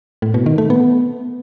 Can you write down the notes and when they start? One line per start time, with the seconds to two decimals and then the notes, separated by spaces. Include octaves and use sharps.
0.22 A2
0.34 B2
0.46 D#3
0.58 A3
0.70 B3